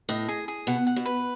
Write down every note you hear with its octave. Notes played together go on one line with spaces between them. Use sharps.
A2 D#5
G#4
G#4
B2 F#5
F#5
B2
B4